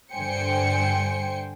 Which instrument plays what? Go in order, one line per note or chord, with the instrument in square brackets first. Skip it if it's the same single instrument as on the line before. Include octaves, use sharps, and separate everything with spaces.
[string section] G2 D3 C5 G5 G#5 C#7